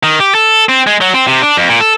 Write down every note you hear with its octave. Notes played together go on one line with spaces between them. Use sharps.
D#3
G4
A4
C4
G#3
F#3
C4
C3
D4
F2
A#2
A4